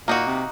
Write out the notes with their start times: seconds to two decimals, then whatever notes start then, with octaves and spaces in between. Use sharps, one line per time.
0.08 A#2 A#3 D#4 F#4
0.27 C3